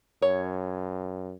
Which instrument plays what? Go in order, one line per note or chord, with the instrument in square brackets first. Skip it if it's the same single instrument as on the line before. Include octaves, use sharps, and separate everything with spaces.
[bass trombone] F#2 [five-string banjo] C#5